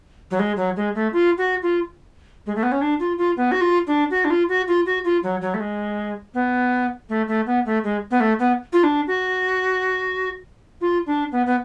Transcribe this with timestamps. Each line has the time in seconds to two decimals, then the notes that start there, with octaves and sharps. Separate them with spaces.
0.31 F#3
0.39 G#3
0.57 F#3
0.76 G#3
0.95 A3
1.13 F4
1.38 F#4
1.62 F4
2.46 G#3
2.55 A3
2.63 B3
2.72 C#4
2.81 D4
3.00 F4
3.18 F4
3.37 B3
3.52 F#4
3.61 F4
3.87 D4
4.11 F#4
4.25 D4
4.30 F4
4.49 F#4
4.68 F4
4.86 F#4
5.04 F4
5.23 F#3
5.41 F#3
5.54 A3
5.60 G#3
6.34 B3
7.09 A3
7.28 A3
7.46 B3
7.66 A3
7.84 G#3
8.11 B3
8.20 A3
8.39 B3
8.73 F4
8.84 D4
9.07 F#4
10.81 F4
11.06 D4
11.32 B3
11.46 B3